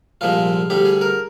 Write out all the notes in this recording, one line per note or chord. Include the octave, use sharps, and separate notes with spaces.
C2 A#2 F3 G#3 F4
D2 D3 G3 G4
G#4
A#4